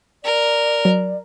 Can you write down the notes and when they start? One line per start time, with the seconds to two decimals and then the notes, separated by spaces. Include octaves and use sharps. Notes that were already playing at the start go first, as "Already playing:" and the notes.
0.24 A#4 D5
0.85 F#3